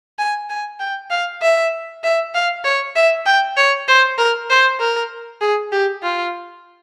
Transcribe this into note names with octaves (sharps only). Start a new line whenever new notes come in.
G#5
G#5
G5
F5
E5
E5
F5
C#5
E5
G5
C#5
C5
A#4
C5
A#4
G#4
G4
F4